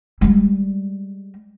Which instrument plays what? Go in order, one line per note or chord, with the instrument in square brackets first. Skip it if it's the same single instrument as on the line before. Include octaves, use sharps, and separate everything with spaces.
[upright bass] G3 G#3